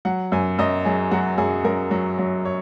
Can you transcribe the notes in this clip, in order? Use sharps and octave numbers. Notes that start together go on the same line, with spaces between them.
F#3 F#5
F#2 G#5
F#2 D#5
F#3 G#4
F#3 F#4
F#2 G#4
F#2 A#4
F#3
F#3
C#5